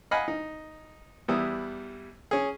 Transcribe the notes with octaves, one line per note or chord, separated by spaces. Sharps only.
D#5 F5 F#5 G#5 B5
D#4
E2 G3 B3 E4 D#6
C#4 G#4